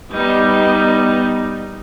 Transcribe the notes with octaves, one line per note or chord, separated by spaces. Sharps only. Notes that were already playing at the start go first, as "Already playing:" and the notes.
G3 B3 D#4